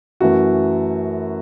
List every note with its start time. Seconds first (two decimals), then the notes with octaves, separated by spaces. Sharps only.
0.20 F#2 E3 A3 F#4